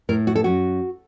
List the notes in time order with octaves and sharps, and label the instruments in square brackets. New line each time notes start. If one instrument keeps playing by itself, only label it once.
[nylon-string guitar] A2 A#4
F#4
A4
F#2 F#4